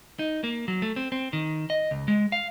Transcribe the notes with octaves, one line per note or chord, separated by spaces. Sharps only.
D#4
A#3
F#3
A3
C4
C4
D#3
D#5
C#2
G#3
F5